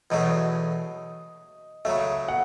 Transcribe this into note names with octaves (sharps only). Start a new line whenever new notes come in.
E2 B2 F#3 A3 D#5
C#3 F#3 A3 E5
F#5